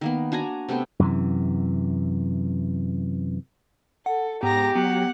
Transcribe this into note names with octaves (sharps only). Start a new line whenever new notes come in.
D#3 A#3 B3
D4 F#4 G#5 A#5
C3 A3 B3 G5
F#2 C3 E3
A4 F#5
G#2 B3 G4 A#5 A#6
F#3 B3 F#5